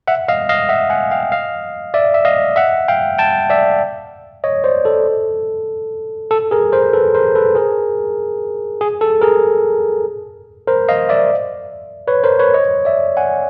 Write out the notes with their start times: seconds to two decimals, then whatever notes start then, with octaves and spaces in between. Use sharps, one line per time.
0.08 E5 F#5
0.28 D#5 F5
0.49 D#5 F5
0.69 E5 F#5
0.90 F#5 G#5
1.11 F5 G5
1.32 D#5 F5
1.94 D5 E5
2.14 E5
2.25 D#5 F5
2.56 E5 F#5
2.88 F5 G5
3.18 G5 A5
3.50 D5 E5
4.44 C#5 D#5
4.64 C5 D5
4.85 A4
6.31 A4
6.51 G#4 A#4
6.72 A#4 C5
6.93 A4 B4
7.15 A#4 C5
7.35 A4 B4
7.55 G#4 A#4
8.81 G#4
9.01 A4
9.21 G#4 A#4
10.67 A#4 C5
10.89 D#5 F5
11.09 D5 E5
12.08 B4 C#5
12.24 A#4 C5
12.39 B4 C#5
12.54 C#5 D#5
12.85 D5 E5
13.17 F#5 G#5